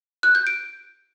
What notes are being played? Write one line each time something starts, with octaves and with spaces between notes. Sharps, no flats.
F#6
G6
D7